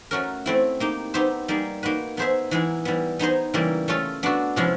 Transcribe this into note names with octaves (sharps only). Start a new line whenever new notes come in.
A3 C#4 F#4 A#4
A3 C4 E4
A#3 D#4 G4
B3 D#4 G4 C5 E5
G3 A#3 D#4 G#4
A#3 D#4 F#4 B4
B3 D#4 G#4 C5 E5
E3 G#3 B3 D#4 G#4
E3 G3 B3
B3 D#4 G#4 C5 D#5
C#3 E3 G3 A#3
A3 C#4 F4 A4
B3 D4 F#4 A4
C3 F3 G#3 C#4 E4